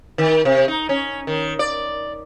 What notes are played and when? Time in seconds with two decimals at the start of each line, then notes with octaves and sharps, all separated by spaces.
0.18 D#3
0.45 C3
0.68 D#4
0.89 C#4
1.27 D#3
1.59 D5